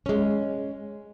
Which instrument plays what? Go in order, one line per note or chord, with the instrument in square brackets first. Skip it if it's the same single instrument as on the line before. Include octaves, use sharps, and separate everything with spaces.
[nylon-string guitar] G#3 C#4